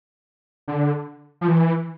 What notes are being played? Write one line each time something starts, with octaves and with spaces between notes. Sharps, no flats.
D3
F3
E3